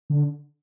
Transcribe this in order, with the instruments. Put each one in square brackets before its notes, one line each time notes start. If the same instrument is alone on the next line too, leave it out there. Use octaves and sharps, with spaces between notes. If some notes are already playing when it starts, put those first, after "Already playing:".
[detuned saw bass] D3